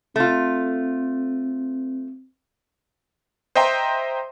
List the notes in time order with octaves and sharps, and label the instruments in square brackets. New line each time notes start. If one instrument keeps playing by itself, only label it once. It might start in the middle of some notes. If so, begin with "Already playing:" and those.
[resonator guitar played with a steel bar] A3 F4 [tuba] C4
[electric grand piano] C5 D#5 E5 G5 A#5 C6